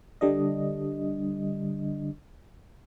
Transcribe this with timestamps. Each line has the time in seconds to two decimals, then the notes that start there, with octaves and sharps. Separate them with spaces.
0.21 D3 G3 D4 D#5